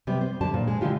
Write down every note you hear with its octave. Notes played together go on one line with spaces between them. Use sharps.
C3 G3 B3
C5
B2 D3 G3 D4 C5 A5
A#2
G#3
D3 G#3 E4 F4 G4